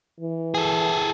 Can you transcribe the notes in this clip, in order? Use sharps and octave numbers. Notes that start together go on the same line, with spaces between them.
E3
G#4 A4